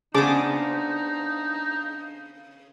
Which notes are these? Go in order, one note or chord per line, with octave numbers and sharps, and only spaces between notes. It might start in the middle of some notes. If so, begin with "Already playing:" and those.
C#3 B3 D4 D#4 G#4 C5 A5 D6